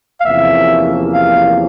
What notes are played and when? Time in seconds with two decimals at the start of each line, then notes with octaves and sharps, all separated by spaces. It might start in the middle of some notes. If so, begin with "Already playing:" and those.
0.20 F5
0.24 E2 C3 F3 A#3 C#4 E5
1.13 F5